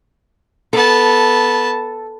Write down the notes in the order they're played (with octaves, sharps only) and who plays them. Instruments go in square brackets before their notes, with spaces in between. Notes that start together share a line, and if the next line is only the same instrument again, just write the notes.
[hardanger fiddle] B3 A5 [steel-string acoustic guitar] A4